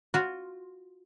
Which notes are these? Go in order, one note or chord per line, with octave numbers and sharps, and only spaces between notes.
F4 F#4